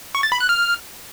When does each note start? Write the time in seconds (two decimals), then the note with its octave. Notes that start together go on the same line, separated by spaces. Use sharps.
0.15 C#6
0.23 A6
0.32 B5
0.40 F#6
0.49 F6